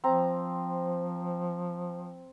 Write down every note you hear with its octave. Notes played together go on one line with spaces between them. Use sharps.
F3 C4 A#5